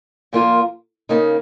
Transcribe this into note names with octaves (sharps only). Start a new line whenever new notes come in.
A#2 F3 A#3 F4 A#4
C#3 A#3 D#4